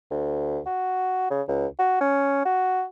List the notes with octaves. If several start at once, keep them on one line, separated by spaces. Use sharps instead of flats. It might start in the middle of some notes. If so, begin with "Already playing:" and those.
D2
F#4
C#3
C#2
F#4
C#4
F#4